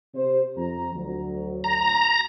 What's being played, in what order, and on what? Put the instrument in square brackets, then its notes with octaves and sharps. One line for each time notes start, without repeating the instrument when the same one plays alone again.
[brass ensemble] C3 C5
F2 A#5
D2 F#3
[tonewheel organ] A#5